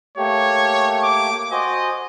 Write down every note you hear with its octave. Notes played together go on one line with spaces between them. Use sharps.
A3 A#3 G4 C#5
D6
F#4 C5 D#5 G#5